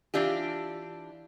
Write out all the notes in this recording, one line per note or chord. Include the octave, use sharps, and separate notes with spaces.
E3 D4 F4 G4